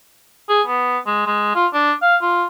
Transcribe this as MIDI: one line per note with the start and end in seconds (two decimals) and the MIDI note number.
0.49 0.62 68
0.67 0.98 59
1.06 1.25 56
1.26 1.52 56
1.55 1.66 65
1.73 1.93 62
2.02 2.16 77
2.22 2.45 65